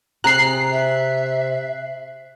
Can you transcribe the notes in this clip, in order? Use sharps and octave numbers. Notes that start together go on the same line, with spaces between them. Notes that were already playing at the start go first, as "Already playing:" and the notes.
C3 C4 G#4 A#5 F#6 C7
E5